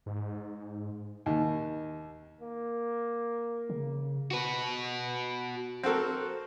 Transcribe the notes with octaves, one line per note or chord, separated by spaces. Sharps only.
G#2
D#2
A#3
C#3
F#4 B4
C4 F#4 A4 A#4